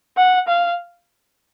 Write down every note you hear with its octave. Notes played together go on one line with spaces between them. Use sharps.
F#5
F5